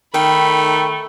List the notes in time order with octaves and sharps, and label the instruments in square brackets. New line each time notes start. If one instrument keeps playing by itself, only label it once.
[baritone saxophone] D#3 [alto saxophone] A3 [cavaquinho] G5 [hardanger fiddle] B5